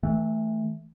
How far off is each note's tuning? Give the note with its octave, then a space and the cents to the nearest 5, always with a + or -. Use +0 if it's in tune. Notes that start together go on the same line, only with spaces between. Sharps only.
E3 -25 A3 -5